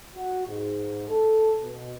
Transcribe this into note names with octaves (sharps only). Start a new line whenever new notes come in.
F#4
G#2
A4
B2